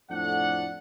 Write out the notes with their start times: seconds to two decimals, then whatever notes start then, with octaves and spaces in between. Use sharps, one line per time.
0.10 F2 A2 A3 D4 D5 F#5